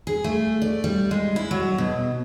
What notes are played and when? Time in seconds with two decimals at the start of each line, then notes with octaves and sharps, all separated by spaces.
0.07 G#4
0.24 A3
0.62 D5
0.84 G3
1.11 G#3
1.36 E4
1.51 F#3
1.78 B2